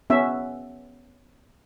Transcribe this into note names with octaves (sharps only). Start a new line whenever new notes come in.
B3 C#4 E5